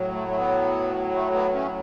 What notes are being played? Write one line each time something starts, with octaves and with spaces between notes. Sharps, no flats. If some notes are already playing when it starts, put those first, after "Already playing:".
Already playing: A2 F#3
A3
A3
B3
A3
B3
A3 C#4